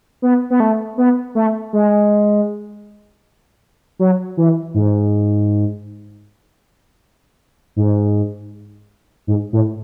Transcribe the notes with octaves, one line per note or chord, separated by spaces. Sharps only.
B3
B3
A3
B3
A3
G#3
F#3
E3
G#2
G#2
G#2
A2